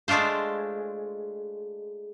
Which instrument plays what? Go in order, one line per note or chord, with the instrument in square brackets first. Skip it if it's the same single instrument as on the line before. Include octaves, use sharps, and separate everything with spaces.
[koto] G#3 A3 D4 F4 C5